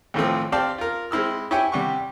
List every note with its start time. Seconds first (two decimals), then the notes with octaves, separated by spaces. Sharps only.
0.14 D#2 A2 E3 F3 A3 C4
0.52 C4 G4 D5 F5 G5 A5
0.78 F4 A#4
1.11 G#3 C4 E4 E6 F6
1.51 E4 G4 C#5 E5 G5 G#5
1.72 C3 G3 G4 F#5 C#6